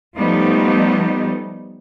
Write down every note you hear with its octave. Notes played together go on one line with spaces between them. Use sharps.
F3 G3 A3 B3 D#4